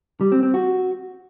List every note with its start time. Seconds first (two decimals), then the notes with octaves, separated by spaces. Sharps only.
0.21 G3
0.32 C4
0.43 C4
0.54 F#4